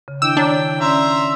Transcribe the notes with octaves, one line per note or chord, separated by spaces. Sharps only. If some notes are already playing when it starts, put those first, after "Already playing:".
C#3
D#3 D4 E4 G5 E6
D4 C#5 A#5 D6
C#4 D5 E5 A#5 C6